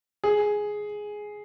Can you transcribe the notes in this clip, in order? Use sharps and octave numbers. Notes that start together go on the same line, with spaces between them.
G#4